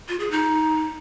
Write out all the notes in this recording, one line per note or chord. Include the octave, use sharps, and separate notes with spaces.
F4
G#4
D#4